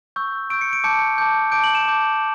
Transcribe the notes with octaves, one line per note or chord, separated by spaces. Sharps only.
C#6 E6 G6
C#6 E6 G6 D7
C#7
D7
A5 D6 G6 C#7
A5 D6 G6
A5 D6 G6 D7
F#7
E7
A5 D6 G6